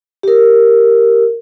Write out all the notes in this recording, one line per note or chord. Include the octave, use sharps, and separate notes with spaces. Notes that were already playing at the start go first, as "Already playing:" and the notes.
G4 A#4